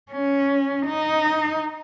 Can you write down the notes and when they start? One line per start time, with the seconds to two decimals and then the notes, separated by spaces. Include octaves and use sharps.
0.11 C#4
0.87 D#4